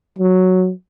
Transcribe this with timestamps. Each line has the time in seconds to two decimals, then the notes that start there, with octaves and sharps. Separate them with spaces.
0.18 F#3